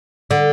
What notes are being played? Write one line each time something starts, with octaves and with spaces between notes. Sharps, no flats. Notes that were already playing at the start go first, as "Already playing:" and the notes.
D3